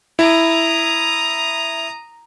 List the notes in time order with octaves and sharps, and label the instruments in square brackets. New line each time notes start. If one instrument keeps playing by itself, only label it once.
[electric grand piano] E4 [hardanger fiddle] A#5 D#6